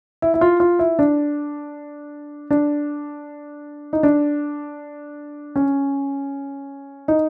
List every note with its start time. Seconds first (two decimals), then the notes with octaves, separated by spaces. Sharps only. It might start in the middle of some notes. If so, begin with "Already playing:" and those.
0.22 E4
0.34 E4
0.41 F4
0.60 F4
0.79 E4
0.99 D4
2.51 D4
3.93 D#4
4.03 D4
5.56 C#4
7.08 D#4